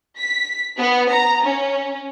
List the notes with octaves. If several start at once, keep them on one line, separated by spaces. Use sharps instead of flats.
B6
B3
A#5
C#4